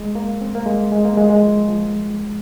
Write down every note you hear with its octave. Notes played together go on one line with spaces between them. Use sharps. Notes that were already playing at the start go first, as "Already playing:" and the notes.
Already playing: G#3
A#3
C4
A#3
G#3
G#3
A#3
G#3
G#3
F3
F3